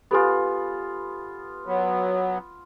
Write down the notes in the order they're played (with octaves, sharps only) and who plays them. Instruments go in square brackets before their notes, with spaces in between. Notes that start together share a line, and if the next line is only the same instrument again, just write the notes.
[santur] B3 F4 [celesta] G4 A4 G#5
[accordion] F#3 B3